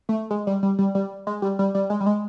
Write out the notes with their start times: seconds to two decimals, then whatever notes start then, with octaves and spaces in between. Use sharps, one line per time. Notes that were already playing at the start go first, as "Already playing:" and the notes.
0.09 A3
0.31 G#3
0.47 G3
0.63 G3
0.79 G3
0.95 G3
1.27 G#3
1.42 G3
1.59 G3
1.75 G3
1.90 G#3
2.00 G3
2.07 G#3